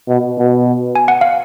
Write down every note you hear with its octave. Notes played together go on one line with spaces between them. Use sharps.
B2
B2
G#5
F#5
F5